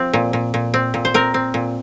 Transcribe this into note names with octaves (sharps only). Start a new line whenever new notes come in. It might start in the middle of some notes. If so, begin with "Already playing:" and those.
Already playing: F3 C4
A#2
A#2
A#2
C4
A#2
C5
C4 A#4
C4
A#2